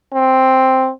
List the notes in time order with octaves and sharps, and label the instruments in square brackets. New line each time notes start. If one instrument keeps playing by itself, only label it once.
[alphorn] C4